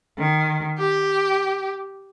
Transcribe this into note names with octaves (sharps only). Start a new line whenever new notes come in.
D#3
G4